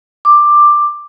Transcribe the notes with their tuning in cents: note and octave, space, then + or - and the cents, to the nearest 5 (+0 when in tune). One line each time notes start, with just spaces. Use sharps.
D6 +10